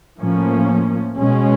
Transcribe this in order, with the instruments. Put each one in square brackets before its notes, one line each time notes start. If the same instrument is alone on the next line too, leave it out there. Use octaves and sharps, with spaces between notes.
[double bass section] A2 F3 A#3 C#4
B2 G#3 C#4